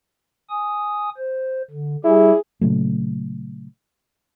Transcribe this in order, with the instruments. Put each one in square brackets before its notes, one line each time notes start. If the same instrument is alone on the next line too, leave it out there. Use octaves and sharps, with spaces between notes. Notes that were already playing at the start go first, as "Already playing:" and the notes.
[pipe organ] G#5 D#6
C5
D3
[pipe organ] G3 G4 [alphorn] E4 [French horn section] G#4
[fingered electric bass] A#2 C#3 F#3 A3